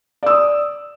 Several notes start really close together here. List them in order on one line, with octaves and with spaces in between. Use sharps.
D5 E6 D#6